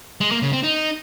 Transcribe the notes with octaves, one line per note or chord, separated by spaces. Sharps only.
G#3
A#3
C#3
C4
D#4